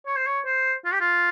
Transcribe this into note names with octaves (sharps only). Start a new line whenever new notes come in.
C#5
C5
C#5
C5
F4
G4
F4